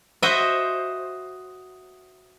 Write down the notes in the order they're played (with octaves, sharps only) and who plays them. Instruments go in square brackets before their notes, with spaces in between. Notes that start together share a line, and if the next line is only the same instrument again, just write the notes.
[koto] F#4 C5 D#5 E5